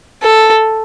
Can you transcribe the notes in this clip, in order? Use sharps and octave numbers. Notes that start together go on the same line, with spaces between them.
A4